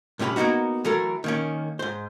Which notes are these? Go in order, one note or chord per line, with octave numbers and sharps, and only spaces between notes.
G2 C3 C#4 G4 B4 B5
A#3 B3 D4 D#4 F#4
E3 F#3 A3 A4 A#4
D#3 A#3 C#4
G#2 C5